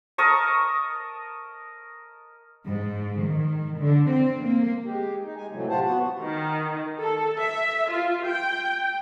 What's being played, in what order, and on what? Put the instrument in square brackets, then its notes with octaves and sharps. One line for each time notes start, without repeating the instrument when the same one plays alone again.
[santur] A#4 D#5 A5 C#6
[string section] G#2
D#3
D3
C4
A#3
[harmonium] G#3 G4
D#4
G#3 G#5
A2 C3 E3 F#3 A3
F4 G4 C5 F#5 A5
B3 F#4 F#5
[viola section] D#3
A4
E5
F4
G5